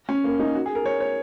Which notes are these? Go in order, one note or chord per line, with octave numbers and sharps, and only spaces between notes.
C#4
A#3
D#4
F#4
G#4
A#4
C#5
C#5